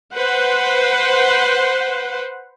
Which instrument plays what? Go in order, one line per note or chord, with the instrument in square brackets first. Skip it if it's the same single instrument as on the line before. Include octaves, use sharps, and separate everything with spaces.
[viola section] B4 C5 F#5